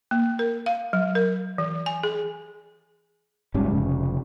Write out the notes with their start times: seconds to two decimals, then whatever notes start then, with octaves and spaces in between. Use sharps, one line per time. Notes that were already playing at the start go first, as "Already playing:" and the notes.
0.11 A#3
0.39 A#4
0.66 F5
0.93 F#3
1.15 A#4
1.58 E3
1.86 G#5
2.03 G#4
3.54 F#1 G#2 G3 C#4
3.70 F1 C#3